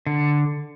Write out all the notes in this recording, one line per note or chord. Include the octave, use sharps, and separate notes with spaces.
D3